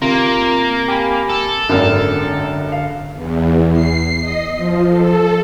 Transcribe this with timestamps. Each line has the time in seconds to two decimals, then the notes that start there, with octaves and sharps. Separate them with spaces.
0.02 C3 A#3 F4 A#4
0.88 G4 G#5 B5
1.30 A4
1.69 G#1 F#2 D3 F6
2.72 F5
3.15 E2
3.73 C7
4.20 D#5
4.57 F3
4.89 A4